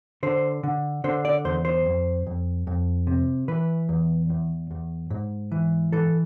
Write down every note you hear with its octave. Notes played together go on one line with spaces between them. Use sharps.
D3 C5
D3
D3 C5
D5
E2 C5
C5
F2
F2
F2
C3
E3 B4
E2
E2
E2
G#2
E3
E3 A4